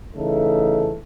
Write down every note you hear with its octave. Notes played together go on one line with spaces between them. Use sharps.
C#3 E3 A3 D#4 A4